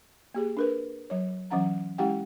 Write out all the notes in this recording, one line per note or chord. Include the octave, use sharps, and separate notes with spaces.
A#3 G4 G#4
D4 A#4 B4
F#3 C#5
E3 F#3 C#4 F#5 A#5
G#3 C#4 E4 G4 F#5 G5